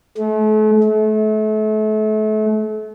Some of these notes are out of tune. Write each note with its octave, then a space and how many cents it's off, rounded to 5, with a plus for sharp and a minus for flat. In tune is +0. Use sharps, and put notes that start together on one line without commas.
A3 -40
A3 -35